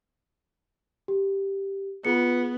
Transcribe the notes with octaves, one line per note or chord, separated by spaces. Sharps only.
G4
B3 F4 G#4 C#7